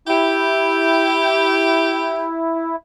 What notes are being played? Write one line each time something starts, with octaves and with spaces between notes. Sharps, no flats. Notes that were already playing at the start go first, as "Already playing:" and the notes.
E4 G4